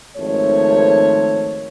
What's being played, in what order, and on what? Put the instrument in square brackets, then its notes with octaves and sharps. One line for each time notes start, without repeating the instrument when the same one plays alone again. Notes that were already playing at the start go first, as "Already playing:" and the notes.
[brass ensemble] G#1 F3 A3 C#5